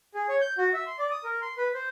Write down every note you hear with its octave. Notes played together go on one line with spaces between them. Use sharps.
G#4
C#5
G6
F#4
E5
C6
D5
D#6
A#4
C6
B4
C5